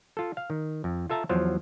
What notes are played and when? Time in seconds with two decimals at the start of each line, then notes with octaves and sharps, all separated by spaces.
0.17 F4 A4
0.37 F5
0.50 D#3
0.84 F2
1.10 F4 A4 E5 A5 A#5
1.29 E2 F3 F#3 C5 F5